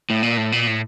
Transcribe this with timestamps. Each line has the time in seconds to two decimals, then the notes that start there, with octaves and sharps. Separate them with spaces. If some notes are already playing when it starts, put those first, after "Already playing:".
0.10 A2
0.23 A#2
0.37 A2
0.52 A#2
0.67 A2